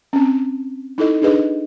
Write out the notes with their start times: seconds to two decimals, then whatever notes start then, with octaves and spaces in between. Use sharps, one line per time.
0.13 C4 C#4
0.98 D#4 E4 A4 D#5
1.22 D4 D#4 G#4 B4 D#5